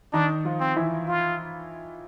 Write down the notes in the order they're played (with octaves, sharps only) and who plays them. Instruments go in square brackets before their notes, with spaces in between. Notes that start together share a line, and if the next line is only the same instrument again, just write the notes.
[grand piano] D#3 D#4 [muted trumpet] D4
[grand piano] F3 F4
[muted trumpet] C4
[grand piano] E3 E4
[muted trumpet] F4